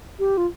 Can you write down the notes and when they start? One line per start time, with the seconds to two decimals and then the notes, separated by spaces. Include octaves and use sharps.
0.19 G4
0.37 F4